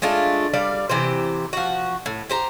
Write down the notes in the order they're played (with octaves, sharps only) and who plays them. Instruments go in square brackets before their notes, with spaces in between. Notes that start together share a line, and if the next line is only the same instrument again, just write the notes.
[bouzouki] G#3 A3 D4 F4
G3 D5 F5
C3 E3 G4 C5
F3 F#4
A2
G4 C5 A#5